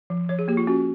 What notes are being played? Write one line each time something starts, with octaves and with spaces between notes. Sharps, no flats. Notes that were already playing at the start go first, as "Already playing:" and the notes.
F3
F3 C#5
G#4
A#3 G4
F4
C#4 F#4